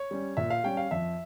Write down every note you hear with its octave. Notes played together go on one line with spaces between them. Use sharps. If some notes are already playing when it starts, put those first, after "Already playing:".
Already playing: C#5
G3 C#4
A#2 E5
F5
G3 C#4 G5
F5
F2 E5